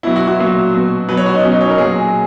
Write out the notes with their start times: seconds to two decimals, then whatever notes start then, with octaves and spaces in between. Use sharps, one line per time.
0.03 B2 F#3 E4
0.16 F#4
0.28 F#4
0.39 A#2 F#3
0.74 B2 F#3
1.09 B2 F#3 B4
1.17 C#5
1.26 F#4
1.34 D#4
1.43 B2 F#3 C#4
1.52 D#4
1.61 C#5
1.69 A#4
1.78 A#2 F#3 G#4